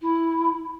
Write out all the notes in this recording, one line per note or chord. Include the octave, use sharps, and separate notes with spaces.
E4